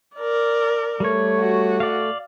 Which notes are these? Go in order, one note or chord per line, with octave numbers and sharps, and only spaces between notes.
A#4 D5
G3 A3 C#5
F#4
D5 F5